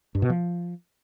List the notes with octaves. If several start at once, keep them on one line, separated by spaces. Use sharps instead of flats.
G2
B2
F3